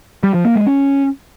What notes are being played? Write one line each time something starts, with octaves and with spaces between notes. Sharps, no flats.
G3
F3
A#3
G#3
C#4